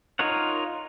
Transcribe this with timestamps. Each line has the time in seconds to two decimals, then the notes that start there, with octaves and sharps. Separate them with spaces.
0.19 D#4 F4 A#4 C#5 F#5